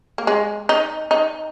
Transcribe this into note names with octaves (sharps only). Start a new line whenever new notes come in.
A#3
G#3
D#4
D#4